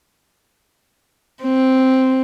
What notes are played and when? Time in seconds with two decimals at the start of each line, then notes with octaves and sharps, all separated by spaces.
1.43 C4